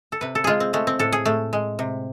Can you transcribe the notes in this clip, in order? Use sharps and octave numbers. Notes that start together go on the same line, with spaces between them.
A4
C3 B4
A4
G#3 F4 G#4
C4
G#3 A3
C4
A2 A4
G#4
A2 A3
G#3
C3